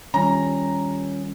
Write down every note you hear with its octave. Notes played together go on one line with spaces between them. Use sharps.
D#3 G3 C#4 F4 A#5